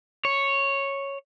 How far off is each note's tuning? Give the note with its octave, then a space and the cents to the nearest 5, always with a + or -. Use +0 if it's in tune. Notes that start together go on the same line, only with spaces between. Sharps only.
C#5 -5